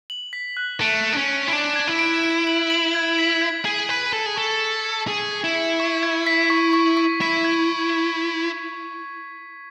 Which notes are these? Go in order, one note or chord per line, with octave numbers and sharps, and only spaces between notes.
F#7
B6
F#6
A3 D7
F#6
D4
C#4
F#6
E4
D4 D7
G#6
E4
D7
D7
F#7
F#7
G#6
B6
G#6
G#4 G#6
B4 B6
A4 F#7
G#4
A4 C#6
C#7
G#6
G#4 G#6
G#6
E4
C#7
C#6
G#6
B6
C#6
C#6
C#6
E4 B6
G#6